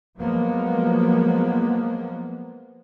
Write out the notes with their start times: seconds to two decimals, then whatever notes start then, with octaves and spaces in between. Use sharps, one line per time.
0.18 F3 F#3 G#3 A#3 B3